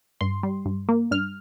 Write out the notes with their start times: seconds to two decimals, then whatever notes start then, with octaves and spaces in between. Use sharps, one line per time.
0.21 G2 C6
0.43 G3
0.66 G2
0.89 A#3
1.11 G2 F6